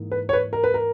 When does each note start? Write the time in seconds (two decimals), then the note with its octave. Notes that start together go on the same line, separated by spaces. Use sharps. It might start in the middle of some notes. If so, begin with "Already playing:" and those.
Already playing: G#2 E3 A#3 D#4
0.12 B4
0.29 C#5
0.33 B4
0.53 A#4
0.64 B4
0.74 A#4